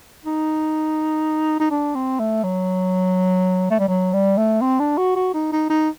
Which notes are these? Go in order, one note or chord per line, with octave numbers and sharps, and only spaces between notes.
D#4
D#4
D4
C4
A3
F#3
A3
G3
F#3
G3
A3
C4
D4
F#4
F#4
D#4
D#4
D#4